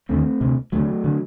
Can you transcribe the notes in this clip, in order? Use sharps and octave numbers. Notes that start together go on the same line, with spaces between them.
D#2 D3 A3 C4
D2 C3
D2 D3 F#3 A3
D3